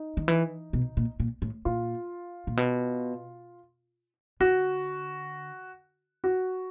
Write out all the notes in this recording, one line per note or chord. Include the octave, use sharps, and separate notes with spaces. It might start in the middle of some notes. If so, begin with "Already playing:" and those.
Already playing: D#4
D#3
E3
B2
A#2
A#2
A2
A#2 F4
A#2
B2
D3 F#4
F#4